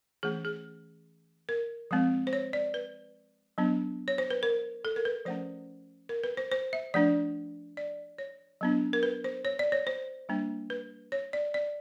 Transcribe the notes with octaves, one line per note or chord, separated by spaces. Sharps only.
E3 A3 C#4 G#4
G#4
A#4
F3 G#3 C4
C5
C#5
D5
B4
F#3 B3 D4
C#5
C5
B4
A#4
A4
A#4
B4
F3 A3 C#4 C5
A#4
B4
C5
C5
E5
F3 A3 D4 D5
D5
C#5
F#3 B3 D4
A#4
B4
C5
C#5
D5
C#5
C5
G3 A#3 D4
B4
C#5
D5
D5